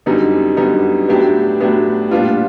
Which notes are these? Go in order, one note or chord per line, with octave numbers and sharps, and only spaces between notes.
F#2 D3 G3 B3 D#4
F#2 D3 G3 B3 D#4
A2 F#3 B3 D4 G4
A2 F#3 B3 D4 G4
A#2 G3 B3 D4 F4